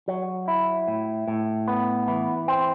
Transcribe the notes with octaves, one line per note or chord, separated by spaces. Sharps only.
F#3
E4
A2
A2
B3
E3
C4